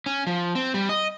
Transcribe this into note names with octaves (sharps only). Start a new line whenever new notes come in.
C#4
F3
C4
G3
D#5